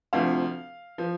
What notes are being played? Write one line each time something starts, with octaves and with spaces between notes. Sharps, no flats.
D2 C3 F3 F5
F3